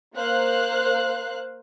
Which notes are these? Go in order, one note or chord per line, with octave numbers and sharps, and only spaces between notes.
A#3 C5 F5 F#6